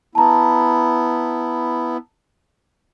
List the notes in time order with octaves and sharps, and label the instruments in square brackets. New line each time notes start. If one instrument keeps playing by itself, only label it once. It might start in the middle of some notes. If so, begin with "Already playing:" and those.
[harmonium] B3 E4 [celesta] A5 A#5